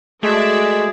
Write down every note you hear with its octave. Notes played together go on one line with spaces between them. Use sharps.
G#3 A3 F#4 G#4 D5 E5